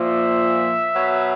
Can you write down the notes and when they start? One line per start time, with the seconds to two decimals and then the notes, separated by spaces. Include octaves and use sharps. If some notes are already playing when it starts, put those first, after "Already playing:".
Already playing: A#2 F3 E5
0.94 B2 F#3